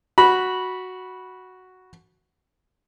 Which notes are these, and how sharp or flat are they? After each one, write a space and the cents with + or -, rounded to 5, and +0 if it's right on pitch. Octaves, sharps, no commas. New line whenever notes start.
F#4 +0 B5 -15